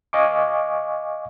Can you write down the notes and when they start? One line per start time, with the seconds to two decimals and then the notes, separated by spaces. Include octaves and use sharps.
0.13 D#5 F5 G#5 C#6 D6